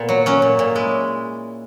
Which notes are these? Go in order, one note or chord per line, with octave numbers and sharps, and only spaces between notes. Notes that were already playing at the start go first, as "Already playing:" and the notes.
Already playing: A#2 B3
F#3
F#3 C#4
A#2
A#2
G#3 E4